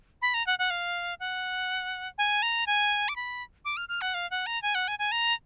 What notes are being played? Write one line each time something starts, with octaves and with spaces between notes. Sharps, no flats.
B5
A#5
F#5
F#5
F5
F#5
G#5
A#5
G#5
D6
B5
D6
F6
F6
F#5
F5
F#5
A#5
G#5
F#5
G#5
G#5
A#5